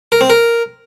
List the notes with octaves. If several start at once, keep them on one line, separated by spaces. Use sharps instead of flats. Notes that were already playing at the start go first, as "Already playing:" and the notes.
A#4
C4
A#4